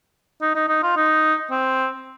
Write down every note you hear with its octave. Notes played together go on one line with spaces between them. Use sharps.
D#4
D#4
D#4
F4
D#4
C4